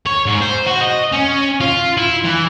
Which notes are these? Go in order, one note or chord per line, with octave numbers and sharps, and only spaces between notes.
C#5
G#2
C5
F#4
D#5
C#4
F4
E4
E3